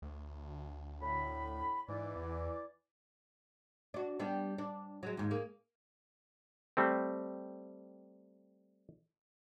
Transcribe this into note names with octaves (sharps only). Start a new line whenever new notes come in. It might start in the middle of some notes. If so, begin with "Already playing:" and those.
D2
A2 B5
G#2 E3 D5
E2
D4 F#4
G3 B3 D4
D4
F#3 G#3
D#2 G#2
A#3 G#4
G3 A3 C4